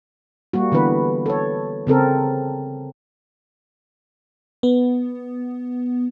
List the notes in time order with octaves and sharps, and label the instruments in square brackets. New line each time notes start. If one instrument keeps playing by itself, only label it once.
[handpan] G3 A#3 F#4
D3 E3 B3 B4
A4 C#5
C#3 C4 A4 A#4
[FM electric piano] B3